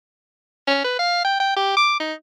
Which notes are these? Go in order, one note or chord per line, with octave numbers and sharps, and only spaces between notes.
C#4
B4
F5
G5
G5
G4
D6
D#4